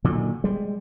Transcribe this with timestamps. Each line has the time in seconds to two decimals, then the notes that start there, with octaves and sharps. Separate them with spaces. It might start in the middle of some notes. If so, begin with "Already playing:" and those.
0.04 A#2 D3 D#3 F#3
0.44 G3 G#3